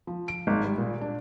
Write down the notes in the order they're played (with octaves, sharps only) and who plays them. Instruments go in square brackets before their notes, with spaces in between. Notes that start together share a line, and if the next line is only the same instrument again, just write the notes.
[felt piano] F3
D7
G#1
G3
A#2
D4